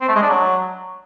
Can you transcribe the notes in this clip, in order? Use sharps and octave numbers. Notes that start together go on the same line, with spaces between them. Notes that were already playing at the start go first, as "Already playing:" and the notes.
C4
A3
G#3
D4
F#3